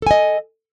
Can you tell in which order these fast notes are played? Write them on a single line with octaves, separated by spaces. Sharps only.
A4 G#5 D#5